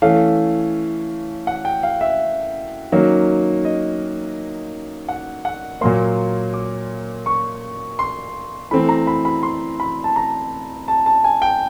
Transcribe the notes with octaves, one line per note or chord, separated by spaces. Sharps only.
E3 A3 C#4 F5
F#5
G5
F5
E5
D#3 F#3 A#3 C#4
D#5
F#5
F#5
A#2 F#3 A#3 C6
D6
C#6
C6
E3 A3 C4 B5
A#5
B5
B5
C6
B5
A5
A#5
A5
A5
G#5
G5